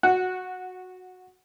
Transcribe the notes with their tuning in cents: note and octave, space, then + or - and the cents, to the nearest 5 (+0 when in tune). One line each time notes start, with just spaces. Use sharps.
F#4 -10 F#5 +0